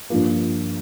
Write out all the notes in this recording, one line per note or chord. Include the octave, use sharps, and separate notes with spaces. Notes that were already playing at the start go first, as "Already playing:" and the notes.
G2 F3 A#3